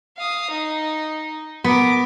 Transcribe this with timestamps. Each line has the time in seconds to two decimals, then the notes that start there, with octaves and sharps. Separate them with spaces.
0.17 F5 D#6
0.50 D#4
1.64 B3 A#4 D6